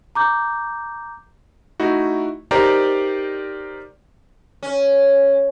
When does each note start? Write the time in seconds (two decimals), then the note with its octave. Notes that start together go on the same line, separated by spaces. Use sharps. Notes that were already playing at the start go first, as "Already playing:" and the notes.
0.15 A#5 D6 G6
1.80 A3 D#4 E4 F#4
2.51 D#4 G4 A#4 C5 D5 A#5
4.63 C#4